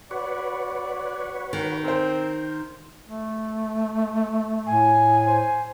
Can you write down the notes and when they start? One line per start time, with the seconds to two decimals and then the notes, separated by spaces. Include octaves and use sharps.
0.11 F#4 B4 C#5 D5
1.53 D#3
1.84 C4 A#4 C5
3.08 A3
4.67 A2 G#5
5.26 C5